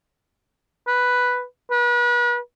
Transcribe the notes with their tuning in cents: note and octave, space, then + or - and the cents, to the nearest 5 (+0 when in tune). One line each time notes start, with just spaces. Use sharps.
B4 +0
B4 -35